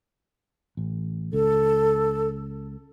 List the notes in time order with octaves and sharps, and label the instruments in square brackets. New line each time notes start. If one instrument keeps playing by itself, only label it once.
[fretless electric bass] A1
[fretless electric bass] C#2 [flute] A4